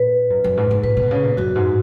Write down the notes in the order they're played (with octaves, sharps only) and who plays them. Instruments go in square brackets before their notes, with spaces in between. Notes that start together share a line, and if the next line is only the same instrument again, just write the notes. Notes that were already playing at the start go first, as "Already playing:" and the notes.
Already playing: [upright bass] A#2 [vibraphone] B4
[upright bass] F#2
F#2
G#2
G#2
[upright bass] A#2 [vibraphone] B4
[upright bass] B2
C#3
A#2
[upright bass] F#2 [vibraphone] F#4
[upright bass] G#2